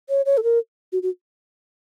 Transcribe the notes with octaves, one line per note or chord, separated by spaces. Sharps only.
C#5
C#5
A4
A#4
F#4
F#4